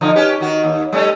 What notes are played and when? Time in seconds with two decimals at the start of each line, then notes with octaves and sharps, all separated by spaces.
0.01 D3 F3 D#4
0.16 C#4 G4 B4
0.41 D#3 F#4
0.63 D#2
0.92 G3 A3 C#4